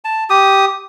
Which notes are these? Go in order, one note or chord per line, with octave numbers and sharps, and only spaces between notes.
A5
G4 D#6